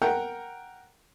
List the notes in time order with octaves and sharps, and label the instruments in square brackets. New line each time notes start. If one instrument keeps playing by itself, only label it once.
[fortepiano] A#4 F#5 G5